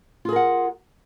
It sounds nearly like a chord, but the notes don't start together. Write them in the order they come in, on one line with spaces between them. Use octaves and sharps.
F4 G#4 A#4 F#5